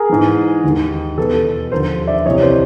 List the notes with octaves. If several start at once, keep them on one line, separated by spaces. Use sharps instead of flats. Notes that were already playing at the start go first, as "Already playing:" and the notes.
Already playing: G#4 A#4
G#2 E3
D#2 D#3
E2 B2 A4 B4
D#2 D3 F3 A#4 C5
D5 E5
C2 C3 E3 C#5 D#5
C5